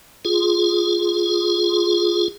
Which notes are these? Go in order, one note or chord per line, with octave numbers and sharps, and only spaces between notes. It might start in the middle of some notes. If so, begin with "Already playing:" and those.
F4 G#4